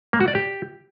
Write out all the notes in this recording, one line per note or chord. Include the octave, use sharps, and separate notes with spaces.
A#3
F#4
D5
G4